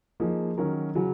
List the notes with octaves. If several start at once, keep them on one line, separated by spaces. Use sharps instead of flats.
F3 A#3 D#4 G#4
D#3 F#3 C#4 F#4 A#4
C#3 F#3 C#4 F#4